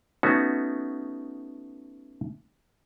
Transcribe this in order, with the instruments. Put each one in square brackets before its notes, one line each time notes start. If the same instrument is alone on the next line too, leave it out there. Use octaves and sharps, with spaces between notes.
[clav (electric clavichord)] A3 B3 C#4 D#4 F#4